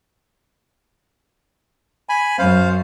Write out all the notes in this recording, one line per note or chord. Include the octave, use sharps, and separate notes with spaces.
G#5 B5
F#2 C5 F5